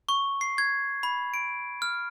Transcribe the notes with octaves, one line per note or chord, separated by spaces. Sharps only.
C#6
C7
G#6
B5
D7
F6